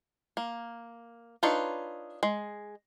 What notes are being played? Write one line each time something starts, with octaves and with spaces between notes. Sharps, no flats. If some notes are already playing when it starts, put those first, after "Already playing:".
A#3
D4 D#4 F4 B4 C#5
G#3